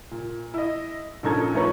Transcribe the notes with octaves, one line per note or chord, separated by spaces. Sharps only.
A#2
E4 D#5
A#1 A#2 C#4 D#4 A4 G#6
F3 A3 D#4 B4 C#5